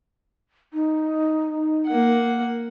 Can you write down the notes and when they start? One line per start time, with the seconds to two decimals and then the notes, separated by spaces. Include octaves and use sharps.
0.73 D#4
1.87 A#3 F#5